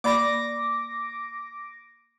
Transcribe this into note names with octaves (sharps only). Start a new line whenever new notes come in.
A#3 D5 B5 D6 A#6